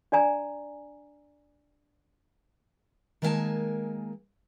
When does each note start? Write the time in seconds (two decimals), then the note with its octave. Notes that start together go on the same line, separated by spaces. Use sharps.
0.12 D4 D5 G#5 A#5
3.22 D#3 G#3 A#3 E5 G#5 A5